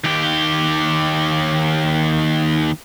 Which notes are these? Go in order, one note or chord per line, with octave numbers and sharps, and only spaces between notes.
D#2 G4